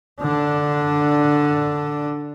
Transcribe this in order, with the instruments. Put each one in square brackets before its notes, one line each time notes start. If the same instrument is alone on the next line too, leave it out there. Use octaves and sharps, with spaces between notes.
[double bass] D3 D4